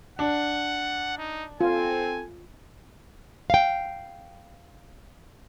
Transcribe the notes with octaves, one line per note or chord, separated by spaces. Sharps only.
D4 F#5
D#4
C4 F4 A4 G#5
F5 G5